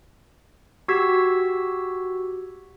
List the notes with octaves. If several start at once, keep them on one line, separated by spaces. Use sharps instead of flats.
F#4 G4 E6 G#6 B6